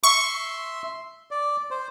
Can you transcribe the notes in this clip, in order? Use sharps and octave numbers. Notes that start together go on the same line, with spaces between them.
E5 C6 C#6
D5
C5